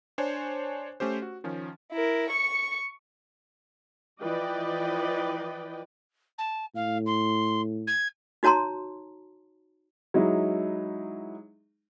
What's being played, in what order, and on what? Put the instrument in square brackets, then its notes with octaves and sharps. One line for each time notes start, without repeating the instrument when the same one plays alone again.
[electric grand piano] D4 C5 C#5 G#5
A3 C#4 G4 C5
F#4
D#3 F3 C#4
[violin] E4 A#4
C#6 C#7
[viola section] E3 F3 B4 D5 D#5 G5
[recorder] A5
[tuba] A2 [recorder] F5
[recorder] C6
G#6
[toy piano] D#4 F#4 C#5 A5 A#5 C6
[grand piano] F#3 G#3 D#4 E4